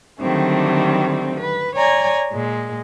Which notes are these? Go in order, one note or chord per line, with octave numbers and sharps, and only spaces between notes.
D3 D#3 F#3 G3 A3 C4
B4
C#5 D5 G#5 A#5
A#2 G#3